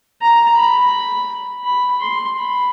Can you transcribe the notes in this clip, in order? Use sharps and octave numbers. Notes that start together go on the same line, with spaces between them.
A#5
B5
B5
C6
B5